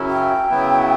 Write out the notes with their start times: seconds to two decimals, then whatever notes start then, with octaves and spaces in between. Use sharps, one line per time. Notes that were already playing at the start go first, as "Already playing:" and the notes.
Already playing: F#2 C#3 F#3 C#4 E4
0.09 G5
0.50 C#3 F#3 B3 E4